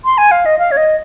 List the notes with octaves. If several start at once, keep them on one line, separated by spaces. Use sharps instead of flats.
C6
G#5
F5
D#5
F5
C#5
D#5